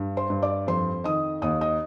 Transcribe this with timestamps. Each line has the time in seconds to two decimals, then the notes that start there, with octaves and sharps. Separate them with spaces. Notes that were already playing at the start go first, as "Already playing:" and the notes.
Already playing: G2
0.17 C5 C6
0.30 G2
0.42 D5 D6
0.67 F2 C5 C6
1.04 D#3 D#5 D#6
1.42 D#2 D#5 D#6
1.61 D#5 D#6